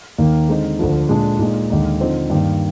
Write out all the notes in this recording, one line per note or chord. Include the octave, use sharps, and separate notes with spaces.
D#2 D#3 A#3
D3 G#3 C4 D#4
D2 D3 F3
A#2 G#3 D4
A#2 G#3 D#4
D#2 D3 G#3 D#4
D3 F3 C4 D#4
G2 D#3 A#3